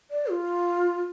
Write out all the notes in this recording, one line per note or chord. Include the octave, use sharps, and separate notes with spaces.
D5
F4